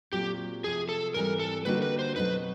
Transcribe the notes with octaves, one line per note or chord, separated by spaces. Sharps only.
A#2 F#3 A3 C4 F4 G4
C3 F3 A3 G#4
A4
G#2 E3 G3 C4 A#4
A4
D3 G3 A#3 D#4 F#4 B4
B4
C5
B2 F#3 A3 C4 D#4 B4